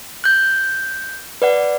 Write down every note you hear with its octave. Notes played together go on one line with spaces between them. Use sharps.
F#6 G6
B4 D5 F#5